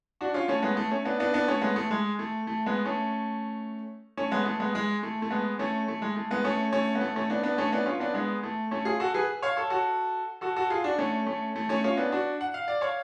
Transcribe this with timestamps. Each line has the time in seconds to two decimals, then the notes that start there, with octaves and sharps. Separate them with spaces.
0.21 D4 F#4
0.34 C#4 F4
0.48 A3 C#4
0.62 G#3 B3
0.77 A3
0.91 A3 C#4
1.05 B3 D4
1.20 B3 D4
1.34 B3 D4
1.48 A3 C#4
1.62 G#3 B3
1.76 A3
1.91 G#3
2.19 A3
2.47 A3
2.66 G#3 B3
2.85 A3 C#4
4.17 A3 C#4
4.32 G#3 B3
4.46 A3
4.60 G#3 B3
4.75 G#3
5.03 A3
5.22 A3
5.31 G#3 B3
5.59 A3 C#4
5.88 A3
6.02 G#3
6.16 A3
6.31 G#3 B3
6.44 A3 C#4
6.72 A3 C#4
6.95 B3
7.01 A3
7.16 A3 C#4
7.30 B3 D4
7.43 B3 D4
7.58 A3 C#4
7.72 B3 D4
7.86 C#4 F4
8.00 B3 D4
8.14 G#3 B3
8.43 A3
8.71 A3 C#4
8.85 F4 G#4
9.00 F#4 A4
9.14 G#4 B4
9.42 C#5 F5
9.57 A4 C#5
9.70 F#4 A4
10.41 F#4 A4
10.56 F#4 A4
10.70 F4 G#4
10.84 D4 F#4
10.98 A3 C#4
11.26 A3 C#4
11.56 A3
11.69 A3 C#4
11.84 C#4 F4
11.97 B3 D4
12.12 D4 F#4
12.41 F#5
12.54 F5
12.68 D5
12.81 C#5 F5